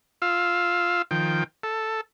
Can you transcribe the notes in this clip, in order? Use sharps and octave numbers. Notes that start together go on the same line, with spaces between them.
F4 F5 E6
D#3 F3 G5
A4